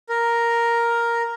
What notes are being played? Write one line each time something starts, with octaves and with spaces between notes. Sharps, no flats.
A#4